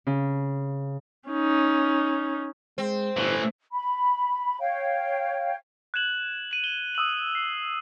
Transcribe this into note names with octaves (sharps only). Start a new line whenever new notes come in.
C#3
C#4 D#4
G#3 C4
G1 A2 E3
B5
C#5 F5 G5
F#6 G#6 E7 F#7
D#7 F#7
G7
D#6 E6 E7 F#7
C7